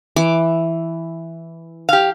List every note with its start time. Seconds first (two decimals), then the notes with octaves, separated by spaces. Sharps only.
0.16 E3 D6
1.89 G4 F5